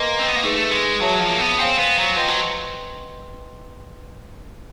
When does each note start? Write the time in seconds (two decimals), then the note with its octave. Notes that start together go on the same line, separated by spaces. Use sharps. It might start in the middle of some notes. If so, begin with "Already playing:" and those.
Already playing: A#3 B4 D#5 G#5 C6
0.19 C4
0.26 B3
0.35 A#3
0.43 A3 D#4 G#4 B4
0.72 G#3
1.01 F#3 G#4 C#5 E5 A5
1.21 F3
1.30 A#3
1.40 B3
1.59 C4 C5 F5 G#5 C6
1.78 B3
1.97 F#3
2.16 F3 B4 D#5 G5 C6
2.28 F#3